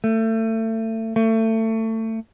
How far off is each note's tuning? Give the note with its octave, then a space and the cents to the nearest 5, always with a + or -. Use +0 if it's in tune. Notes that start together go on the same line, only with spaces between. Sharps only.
A3 +30
A3 +25